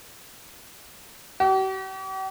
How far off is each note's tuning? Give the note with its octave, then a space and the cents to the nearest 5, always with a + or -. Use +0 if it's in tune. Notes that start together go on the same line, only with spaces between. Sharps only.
G4 -45